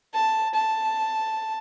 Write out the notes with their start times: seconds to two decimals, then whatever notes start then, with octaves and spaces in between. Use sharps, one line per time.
0.14 A5
0.54 A5